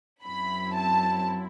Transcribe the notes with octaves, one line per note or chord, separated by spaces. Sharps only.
F#2 F#3 C4 E4 B5
A5